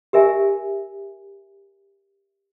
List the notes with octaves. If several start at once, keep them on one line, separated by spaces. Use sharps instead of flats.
G4 A#4 E5 G#5